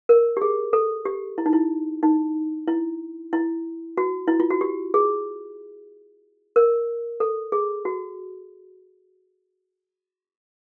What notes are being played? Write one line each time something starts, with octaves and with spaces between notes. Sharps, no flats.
A#4
G4
G#4
A4
G4
E4
D#4
E4
D#4
E4
E4
F#4
E4
F4
F#4
G4
G#4
A#4
A4
G#4
F#4